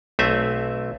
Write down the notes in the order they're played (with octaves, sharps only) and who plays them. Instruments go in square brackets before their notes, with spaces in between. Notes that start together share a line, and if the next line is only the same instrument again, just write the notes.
[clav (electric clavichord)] B1 A3 C4 E5 G#5